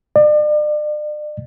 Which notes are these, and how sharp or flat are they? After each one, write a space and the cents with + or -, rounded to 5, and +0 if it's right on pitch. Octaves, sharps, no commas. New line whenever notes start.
D5 +40